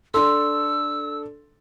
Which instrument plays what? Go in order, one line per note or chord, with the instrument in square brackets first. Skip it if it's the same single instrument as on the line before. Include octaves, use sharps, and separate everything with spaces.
[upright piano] D4 A4 [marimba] C6 [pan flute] E6